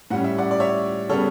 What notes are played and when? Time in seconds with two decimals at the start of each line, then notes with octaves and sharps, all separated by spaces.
0.10 A2 G3 C#4 F#5
0.24 E5
0.38 D5 F#5
0.51 D5
0.60 C#5 E5
1.09 C#3 G3 B3 A4 C#5